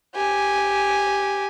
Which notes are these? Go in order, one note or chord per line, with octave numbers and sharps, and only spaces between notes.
G4 G#5